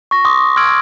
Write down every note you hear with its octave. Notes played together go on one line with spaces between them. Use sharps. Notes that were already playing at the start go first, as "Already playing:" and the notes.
C#6 A#6
C6 D6 D#6
C6 E6 F6 G#6 D7 F#7